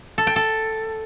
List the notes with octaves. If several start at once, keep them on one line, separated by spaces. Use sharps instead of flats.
A4
G5
A4